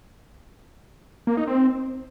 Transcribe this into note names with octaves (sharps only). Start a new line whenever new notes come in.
A#3
D#4
C4